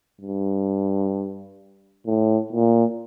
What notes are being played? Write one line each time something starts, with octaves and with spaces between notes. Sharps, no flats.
G2
A2
A#2